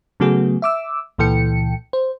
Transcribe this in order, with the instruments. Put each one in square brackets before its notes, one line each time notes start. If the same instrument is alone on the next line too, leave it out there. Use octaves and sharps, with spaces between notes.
[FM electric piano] C#3 F#3 A3 B3 F#4 G#4
E5 D6 E6
C#2 A#2 E3 A4 G5 C#7
C5